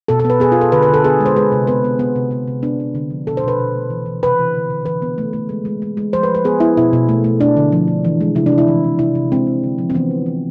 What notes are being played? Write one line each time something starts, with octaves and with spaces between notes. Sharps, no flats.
B2 A4
A4
B3
B4
B3 G#4
B3 F4
A4
D3 B4
B4
D3
A4
B3 G#4
G#3
C5
G#3 B4
C3
B3 B4
B3
B3
C3
B3
C3
B3 D4
B3
D3
F3
B2 A4
C5
B2 B4
B2
A3
E3
E3
C3 B4
E3
D3
D3
E3 B4
B3
A3
A3
G#3
G#3
G#3
G#3
F3 C5
B4
F3
B4
B3 G#4
B3 E4
B2 E4
B2
A3
A3
A3 D4
D3
F3
F3
E3
G#3
C3 E4
D4
C3
E4
E3
E3
C3 E4
C3
G#3 C4
G#3
D3
F3
C4
E3 B3
E3
E3